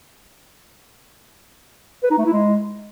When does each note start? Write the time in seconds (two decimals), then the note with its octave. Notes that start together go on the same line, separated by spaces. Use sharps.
2.03 B4
2.11 D#4
2.18 A3
2.26 E4
2.33 G#3